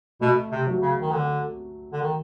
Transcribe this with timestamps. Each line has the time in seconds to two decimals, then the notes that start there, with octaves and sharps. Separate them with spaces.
0.21 B2 A3
0.51 C3
0.67 F#3
0.82 C#3
1.01 D#3
1.12 D3
1.93 D3
2.02 D#3